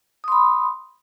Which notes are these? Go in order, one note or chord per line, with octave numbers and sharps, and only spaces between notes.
B5 C6 D#6